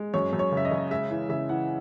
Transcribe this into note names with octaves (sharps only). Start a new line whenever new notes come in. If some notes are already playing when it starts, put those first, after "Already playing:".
Already playing: G#3
F#2 C#5
F#2
C#5
C#3 E5
D#5
C#3
G#3 E5
E3
C#3 E5
E3 F#5